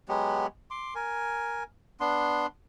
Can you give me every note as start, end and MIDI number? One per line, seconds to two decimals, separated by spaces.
0.09 0.47 54
0.09 0.47 56
0.09 0.47 59
0.09 0.47 67
0.71 0.94 84
0.71 0.94 86
0.95 1.63 70
0.95 1.63 80
2.00 2.46 59
2.00 2.46 62
2.00 2.46 84